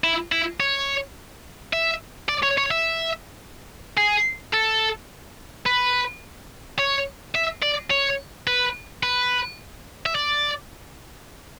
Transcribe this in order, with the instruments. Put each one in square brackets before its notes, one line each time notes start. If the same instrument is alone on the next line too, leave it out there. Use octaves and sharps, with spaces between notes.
[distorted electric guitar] E4
E4
C#5
E5
D5
C#5
C#5
E5
G#4
A4
B4
C#5
E5
D5
C#5
B4
B4
E5
D5